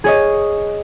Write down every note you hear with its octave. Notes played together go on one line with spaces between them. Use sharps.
G#4 C#5 D#5